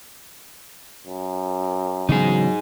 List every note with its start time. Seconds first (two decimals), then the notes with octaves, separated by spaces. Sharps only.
1.06 F#2
2.09 C#3 E3 F#3 B3 D#4 G#4